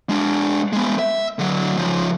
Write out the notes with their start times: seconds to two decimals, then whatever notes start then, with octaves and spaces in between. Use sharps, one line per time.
0.09 G#3 D4
0.73 G#3 B3
0.99 E5
1.39 D3 F#3
1.77 C#3 F3